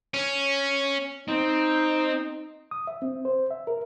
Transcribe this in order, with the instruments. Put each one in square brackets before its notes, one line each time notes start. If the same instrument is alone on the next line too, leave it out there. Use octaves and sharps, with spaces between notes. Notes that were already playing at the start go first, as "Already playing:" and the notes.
[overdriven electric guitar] C#4
[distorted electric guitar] C4 [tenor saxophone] D#4
[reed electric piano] D#6
E5
C4
C5
E5
A#4